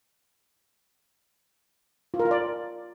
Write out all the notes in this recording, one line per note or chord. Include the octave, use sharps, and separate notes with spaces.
F4
A#4
F4
D5